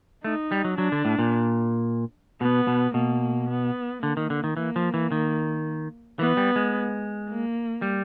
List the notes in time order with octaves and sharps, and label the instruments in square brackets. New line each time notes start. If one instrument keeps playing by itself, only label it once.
[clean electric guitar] A3 [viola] D#4
[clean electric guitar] G3
F#3
[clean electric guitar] F#3 [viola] D4
[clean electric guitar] D3
A2
A#2
[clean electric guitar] B2 [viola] B3
[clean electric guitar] B2
[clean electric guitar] B2 [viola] A#3
[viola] B3
[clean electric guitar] D3 [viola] A#3
[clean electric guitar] D#3
D3
D#3
[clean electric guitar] E3 [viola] A#3
[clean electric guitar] F3
E3
D#3
[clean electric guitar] E3 [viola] B3
[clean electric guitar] G3
G#3
[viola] A#3
[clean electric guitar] G3